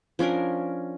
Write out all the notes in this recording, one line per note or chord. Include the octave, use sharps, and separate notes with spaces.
F3 C#4 D4 A#4